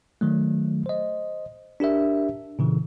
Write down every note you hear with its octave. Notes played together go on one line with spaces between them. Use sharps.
D#3 F#3 A3
C5 D#5
D4 G4 A#4 E5
A#2 C#3 E3